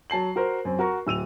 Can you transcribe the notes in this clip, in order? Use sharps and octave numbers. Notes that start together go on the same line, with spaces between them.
F#3 A5 C7 F#7
F#4 A#4 C5
F#2 C4
F#4 A#4 A#5 C#6
D1 E6 D#7 F7